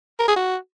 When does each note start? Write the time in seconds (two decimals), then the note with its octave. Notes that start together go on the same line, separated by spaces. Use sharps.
0.19 A#4
0.28 G#4
0.36 F#4